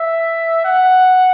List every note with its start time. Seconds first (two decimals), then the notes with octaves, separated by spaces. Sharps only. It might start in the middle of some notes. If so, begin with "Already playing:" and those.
Already playing: E5
0.65 F#5